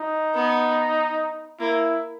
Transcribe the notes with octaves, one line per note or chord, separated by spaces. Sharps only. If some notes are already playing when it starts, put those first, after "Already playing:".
Already playing: D#4
B3
A#3 E4